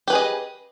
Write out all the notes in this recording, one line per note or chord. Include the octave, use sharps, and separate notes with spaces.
G4 G#4 B4 D#5